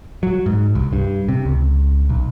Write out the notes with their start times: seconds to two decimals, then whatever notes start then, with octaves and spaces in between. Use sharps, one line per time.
0.23 F#3
0.46 G#2
0.75 C2
0.93 G2
1.29 C3
1.45 C#2
2.09 B1